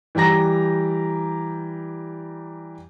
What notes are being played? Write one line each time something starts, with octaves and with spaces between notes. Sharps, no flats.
E3 G3 G4 A#5 A#6